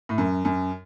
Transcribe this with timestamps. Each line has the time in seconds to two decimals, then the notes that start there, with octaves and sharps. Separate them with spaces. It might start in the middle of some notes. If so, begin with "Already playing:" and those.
0.09 A2
0.18 F#2
0.45 F#2